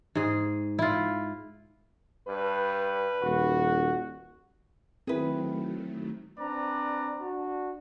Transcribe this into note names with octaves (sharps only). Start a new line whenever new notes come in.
G#2 G#4
E4 F4
G2 B4
D#1 F#4
D#3 F#3 A3 C4 E4 G#4 B4
C4 D4 B4 D5 A#5
D4 F#4